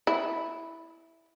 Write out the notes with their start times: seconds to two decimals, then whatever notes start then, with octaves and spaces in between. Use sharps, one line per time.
0.07 E4